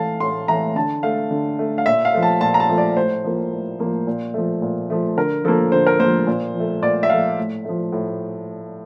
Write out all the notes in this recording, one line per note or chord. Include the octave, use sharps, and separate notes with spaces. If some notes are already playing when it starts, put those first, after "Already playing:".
Already playing: E3 A3 F5 A5
A2 C6
E3 A3 A#5
D3 A5
A3 F5
D3
A3
F5
A#2 E5
F5
F3 A3
A5
A#2 A5
A#5
A5
F3 A3
D5
A2 C5
F3 A#3
A2
F3 A#3
A#2
F3 A3
A#2
F3 A3
D3 A#4
F3 A#3 A4
D3 C5
A#4
F3 A#3 C5
A#2
F3
A3
A#2 D5
E5
F3 A3 F5
A2
F3 A3
A2